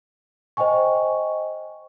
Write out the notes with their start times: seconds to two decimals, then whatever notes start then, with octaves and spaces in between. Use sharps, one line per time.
0.57 C5 D#5 G5 G#5 C#6